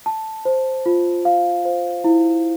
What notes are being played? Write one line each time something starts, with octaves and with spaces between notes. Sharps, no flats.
A5
C5
F4
F5
C5
E4